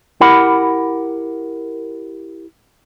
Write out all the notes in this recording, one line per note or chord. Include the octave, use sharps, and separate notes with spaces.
E4 G4 A#4 F#5 B5